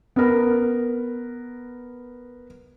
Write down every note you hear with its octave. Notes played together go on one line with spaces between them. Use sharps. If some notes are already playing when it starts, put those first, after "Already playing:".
B3 A#4